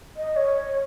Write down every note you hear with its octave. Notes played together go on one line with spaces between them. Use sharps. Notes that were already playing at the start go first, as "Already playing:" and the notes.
D#5
C#5
C#5